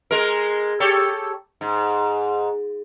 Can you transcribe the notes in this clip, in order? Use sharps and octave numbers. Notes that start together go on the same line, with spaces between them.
G#3 A#4
G4 A4 C#5
G#2